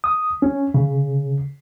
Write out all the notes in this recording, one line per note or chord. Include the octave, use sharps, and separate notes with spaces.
D#6
C#4
C#3